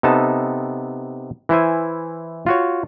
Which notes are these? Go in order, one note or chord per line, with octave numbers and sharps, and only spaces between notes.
C3 B3 D#4 A4 A5
E3 E4 C5 G#5
F4 F#4 C#5